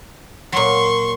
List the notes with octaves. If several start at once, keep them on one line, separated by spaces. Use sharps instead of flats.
A#2 F#3 C6 C#6